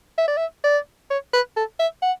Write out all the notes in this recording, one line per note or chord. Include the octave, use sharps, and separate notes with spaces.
E5
D5
E5
D5
C#5
B4
A4
E5
F#5